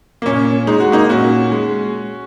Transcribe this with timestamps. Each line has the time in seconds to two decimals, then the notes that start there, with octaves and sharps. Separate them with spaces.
0.22 A#3
0.26 A#2 C#4
0.67 G#3 D#4
0.80 F#4
0.92 A#3 D#4
1.09 A#2 C#4 F#4
1.52 G#3